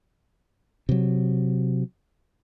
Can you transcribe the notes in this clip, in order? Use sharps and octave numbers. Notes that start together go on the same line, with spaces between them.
C3 F#3